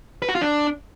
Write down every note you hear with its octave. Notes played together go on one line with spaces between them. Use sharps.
B4
F#4
F4
D4